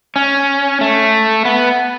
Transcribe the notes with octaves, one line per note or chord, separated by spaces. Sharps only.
C#4
A3
B3